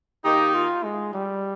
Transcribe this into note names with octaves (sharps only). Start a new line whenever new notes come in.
D#3 A#3 D#4 G4
F4
G#3
G3